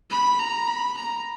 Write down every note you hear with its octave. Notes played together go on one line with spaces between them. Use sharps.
B5
A#5
B5
A#5